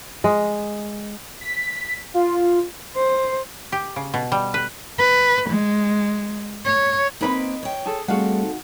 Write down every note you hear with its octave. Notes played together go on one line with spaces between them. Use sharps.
G#3
B6
F4
C5
G4
C#3
B2
G3
B4
B4
G#3
C#5
A#3 C4 D#4 B4 B5
C#5 G5
G#4 A4
G3 A3 C4 F#4 G#4 A4 F5 F#5
D#4